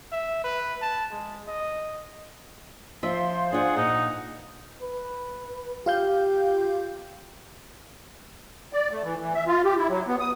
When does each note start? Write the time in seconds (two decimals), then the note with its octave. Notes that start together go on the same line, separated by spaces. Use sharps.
0.12 E5
0.44 B4
0.82 A5
1.11 G#3
1.47 D#5
3.03 F3 C5 E5 F5 C6
3.52 D4 F4 G#4 F#5
3.77 A#2 D#4
4.81 B4
5.86 F4 G4 F5 G6
8.73 D5
8.91 A3
9.03 E3
9.20 E3
9.35 E5
9.47 F4
9.65 G4
9.77 E4
9.89 F#3
10.07 B3
10.20 D#6